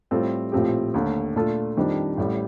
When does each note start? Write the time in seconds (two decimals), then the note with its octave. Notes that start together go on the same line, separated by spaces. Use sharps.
0.11 A2 G3 C4 F4 A4
0.52 A#1 A2 F3 C4 G4
0.94 D#2 D3 A3
1.35 A#2 A3 D4 F4 A4
1.77 F2 D#3 G3 D4
2.17 A1 A2 G3